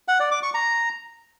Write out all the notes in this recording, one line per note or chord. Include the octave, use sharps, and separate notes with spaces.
F#5
D5
D6
C#6
A#5